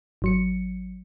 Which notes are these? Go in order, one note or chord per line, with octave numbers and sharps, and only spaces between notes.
G#1 F#3 C#7